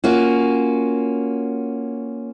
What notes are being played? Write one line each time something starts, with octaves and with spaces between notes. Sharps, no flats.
A#3 C#4 F4 F#4